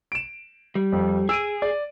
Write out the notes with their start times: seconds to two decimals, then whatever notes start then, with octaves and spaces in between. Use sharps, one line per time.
0.12 D7 E7
0.75 G3
0.92 F2
1.29 G#4 E6 D7 D#7
1.62 D5